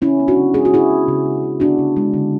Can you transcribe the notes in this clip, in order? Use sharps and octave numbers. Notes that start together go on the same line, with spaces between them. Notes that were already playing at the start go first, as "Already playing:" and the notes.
C#3 C#4 E4
B3
D4 F#4
C#3
G#3 G#4
F#4
C#3 E4 G#4
B3
C#3
G#3
C#3
B3 D4 F#4
C#3
G#3
D3